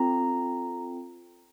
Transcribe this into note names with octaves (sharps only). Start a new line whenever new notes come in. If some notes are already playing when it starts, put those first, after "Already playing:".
Already playing: C4 F4 A4 A#5